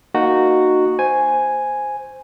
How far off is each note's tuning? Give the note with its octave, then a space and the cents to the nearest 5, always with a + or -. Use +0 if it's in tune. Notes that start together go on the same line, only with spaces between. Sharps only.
A#3 +0 D#4 -15 F#4 +0
C5 -5 G#5 +0